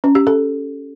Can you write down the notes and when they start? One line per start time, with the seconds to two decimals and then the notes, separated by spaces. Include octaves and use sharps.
0.04 C#4
0.15 G4
0.27 A4